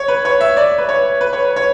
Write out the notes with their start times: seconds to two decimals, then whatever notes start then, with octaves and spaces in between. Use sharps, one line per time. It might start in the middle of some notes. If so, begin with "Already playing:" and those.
Already playing: C#5
0.08 B4
0.25 C#5
0.41 E5
0.57 D5
0.78 B4
0.89 C#5
1.21 B4
1.33 C#5
1.45 B4
1.56 C#5